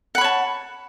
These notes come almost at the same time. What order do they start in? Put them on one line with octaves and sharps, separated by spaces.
F#5 B5 C#5 A5